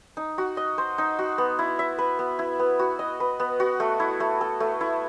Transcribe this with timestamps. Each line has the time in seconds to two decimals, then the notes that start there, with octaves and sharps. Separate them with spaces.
0.17 D#4
0.38 F#4
0.57 D#5
0.78 C5
0.98 D#4
1.19 F#4
1.38 B3
1.59 E4
1.79 E5
1.98 B4
2.19 B3
2.39 E4
2.59 B3
2.79 F#4
2.99 D#5
3.20 B4
3.40 B3
3.60 F#4
3.80 A3
4.00 E4
4.20 A3
4.41 A4
4.60 A3
4.81 E4